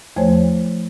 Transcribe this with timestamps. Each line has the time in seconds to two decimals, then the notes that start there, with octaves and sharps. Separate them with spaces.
0.16 E2 F3 A3 C5 C#5